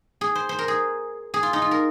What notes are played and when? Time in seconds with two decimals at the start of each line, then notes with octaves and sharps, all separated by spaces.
0.21 G#4
0.35 C5
0.49 C5
0.59 A#4
0.68 G#4
1.34 G#4
1.43 F4
1.53 D#4
1.62 F4
1.71 A#4